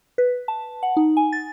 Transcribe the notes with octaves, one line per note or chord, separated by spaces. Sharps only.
B4
A5
F#5
D#4
G#5
A6